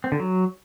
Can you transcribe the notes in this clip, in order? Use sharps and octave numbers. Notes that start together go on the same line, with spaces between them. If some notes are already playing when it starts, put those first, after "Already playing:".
C4
D3
F#3